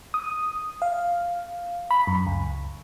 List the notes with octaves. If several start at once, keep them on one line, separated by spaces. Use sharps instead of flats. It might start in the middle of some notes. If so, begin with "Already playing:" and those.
D#6
F5
B5
F#2
C#2